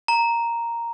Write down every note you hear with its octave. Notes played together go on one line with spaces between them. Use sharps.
A#5